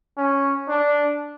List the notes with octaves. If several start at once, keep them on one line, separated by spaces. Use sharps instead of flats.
C#4
D4